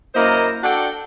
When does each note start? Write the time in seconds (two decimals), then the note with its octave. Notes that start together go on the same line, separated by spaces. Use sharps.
0.15 F#2 A#3 E4 C5 D#5 A#5
0.64 D4 F#4 A4 D5 F#5 G5